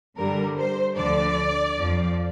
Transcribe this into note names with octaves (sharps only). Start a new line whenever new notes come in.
G2 D3 G3 A#4
C5
D2 D3 F3 D5
F2 F3